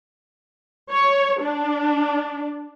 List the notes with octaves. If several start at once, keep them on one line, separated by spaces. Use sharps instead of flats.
C#5
D4